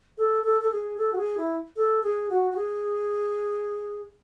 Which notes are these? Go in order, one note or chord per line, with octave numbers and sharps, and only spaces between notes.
A4
A4
A4
G#4
A4
F#4
G#4
E4
A4
G#4
F#4
F#4
G#4